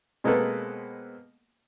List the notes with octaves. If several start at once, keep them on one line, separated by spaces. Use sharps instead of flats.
B2 G#3 A#3 C4 A4 B4